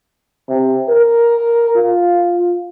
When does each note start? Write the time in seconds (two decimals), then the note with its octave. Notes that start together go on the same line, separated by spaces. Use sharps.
0.49 C3
0.89 A#4
1.76 F4